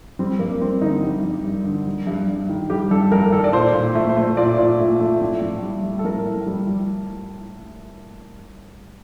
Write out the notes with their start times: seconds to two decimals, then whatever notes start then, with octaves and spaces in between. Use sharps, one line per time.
0.19 G3 C4
0.39 G2 A#3
0.61 G2 C4
0.81 D3 D#4
1.03 G3
1.24 G2
1.44 G2
1.65 D3
1.87 G3
2.07 G2
2.28 G2
2.49 D#3
2.70 G3 G4
2.91 G2 A4
3.12 G2 A#4
3.33 D#3 A4
3.44 D5
3.53 A#2 C5
3.75 A#2
3.95 A3
4.09 C5
4.17 A3
4.37 A#2 D5
4.58 A#2
4.80 A3
5.00 A3
5.21 A2
5.42 A2
5.62 G3
5.83 G3
5.99 A4
6.04 A2 A#4
6.25 A2
6.46 G3
6.67 G3